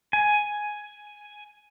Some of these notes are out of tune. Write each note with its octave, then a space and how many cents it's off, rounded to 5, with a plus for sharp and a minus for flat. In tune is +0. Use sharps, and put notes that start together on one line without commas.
G#5 +5